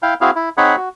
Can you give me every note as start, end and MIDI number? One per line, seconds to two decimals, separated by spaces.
0.03 0.14 64
0.03 0.14 77
0.03 0.14 79
0.21 0.31 60
0.21 0.31 64
0.21 0.31 66
0.21 0.31 68
0.21 0.31 77
0.36 0.49 64
0.57 0.76 60
0.57 0.76 63
0.57 0.76 68
0.57 0.76 73
0.57 0.76 78
0.57 0.76 83
0.76 0.89 66